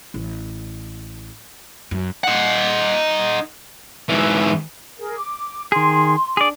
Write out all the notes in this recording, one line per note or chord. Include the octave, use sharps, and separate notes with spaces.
A1
F#2
D#4 F#5
G#2 E3
G#4 A#4
D6
D#3 G#4 C6
D4 G#4 D5